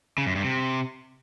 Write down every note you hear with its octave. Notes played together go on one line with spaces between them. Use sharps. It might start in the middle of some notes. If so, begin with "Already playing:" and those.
C#3
F#2
G2
C3